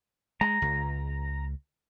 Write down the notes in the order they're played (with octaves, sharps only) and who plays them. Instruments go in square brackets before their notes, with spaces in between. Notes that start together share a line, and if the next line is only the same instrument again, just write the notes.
[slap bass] G#3 [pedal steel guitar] A#5
[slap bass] C#2